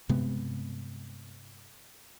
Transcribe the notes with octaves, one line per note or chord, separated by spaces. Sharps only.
G2 C3 G#3 B3